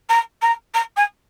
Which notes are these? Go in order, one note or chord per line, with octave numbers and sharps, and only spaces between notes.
A#5
A#5
A#5
G#5